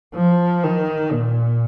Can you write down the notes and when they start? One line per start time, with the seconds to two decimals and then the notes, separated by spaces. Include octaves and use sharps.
0.14 F3
0.63 D#3
1.12 A#2